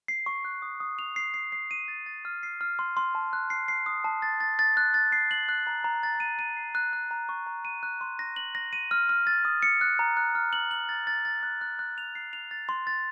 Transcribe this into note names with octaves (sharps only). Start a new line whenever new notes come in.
C7
C#6
F#6
D#6
D#6
F7
C7
C7
C7
D#7
A6
A6
F6
C7
F6
C6
C6
A5
F#6
C7
C7
D#6
A5
A6
A6
A6
F#6
A6
C7
F#7
F#6
A#5
A#5
A6
D#7
D#7
C7
F#6
F#6
A#5
C#6
A#5
D#7
F#6
C6
A#6
F#7
A#6
D#7
F6
F6
A6
D#6
C#7
F#6
A#5
F#6
F6
F#7
F#7
A6
A6
A6
F#6
F#6
F#6
F7
C7
F7
A6
C6
A6